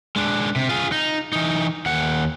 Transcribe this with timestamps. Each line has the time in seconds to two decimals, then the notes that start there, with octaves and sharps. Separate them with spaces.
0.16 G#3 D4
0.56 C3
0.69 F4 G#4
0.92 D#4
1.33 E3 D#4
1.86 D#2 F#5